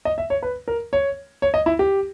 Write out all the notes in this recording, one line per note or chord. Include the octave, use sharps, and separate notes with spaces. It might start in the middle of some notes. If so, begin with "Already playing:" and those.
D#5
E5
C#5
B4
A#4
C#5
C#5
D#5
E4
G4